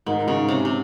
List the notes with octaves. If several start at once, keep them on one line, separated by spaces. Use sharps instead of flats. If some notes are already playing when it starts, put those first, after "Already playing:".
G#2 D#3
G#2 C#3
C3 C#4
C3